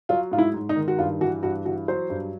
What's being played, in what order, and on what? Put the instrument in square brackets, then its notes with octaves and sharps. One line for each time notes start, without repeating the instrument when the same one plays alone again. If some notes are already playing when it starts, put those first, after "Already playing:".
[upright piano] F#3 F4
G#2 F4
E4
G#2
D#4
D#3
F#4
G2 F4
E3 F#4
G2 F#4
E3 F#4
F#3 C5
G2